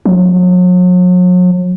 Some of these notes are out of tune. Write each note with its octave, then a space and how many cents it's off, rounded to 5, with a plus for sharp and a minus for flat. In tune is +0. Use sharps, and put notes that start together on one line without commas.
F#3 -40